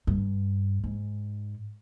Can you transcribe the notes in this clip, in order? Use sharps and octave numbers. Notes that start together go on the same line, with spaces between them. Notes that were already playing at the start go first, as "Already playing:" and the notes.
G2
G#2